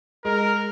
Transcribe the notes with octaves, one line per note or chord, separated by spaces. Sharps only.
G#3 A#4